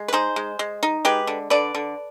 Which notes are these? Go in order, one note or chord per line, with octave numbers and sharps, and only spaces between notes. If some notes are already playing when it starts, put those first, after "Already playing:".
Already playing: G#3
B4
D#4 G#4 C5
G#3
G#3
D#4
G#3 G4 B4
D3
D3 B4 D5
D3